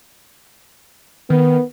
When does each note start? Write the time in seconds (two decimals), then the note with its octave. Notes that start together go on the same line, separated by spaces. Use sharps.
1.30 D#3 B3